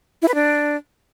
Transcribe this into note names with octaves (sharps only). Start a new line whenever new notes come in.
E4
B4
D4